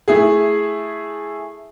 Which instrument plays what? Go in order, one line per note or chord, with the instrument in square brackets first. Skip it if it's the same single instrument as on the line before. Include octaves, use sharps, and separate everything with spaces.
[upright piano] A3 E4 G#4